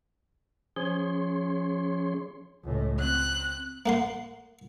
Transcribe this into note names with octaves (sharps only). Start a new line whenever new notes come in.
F3 C#4 G#4 C#5 C6
C#2 A2
C4 F#6
A#3 F#5 C6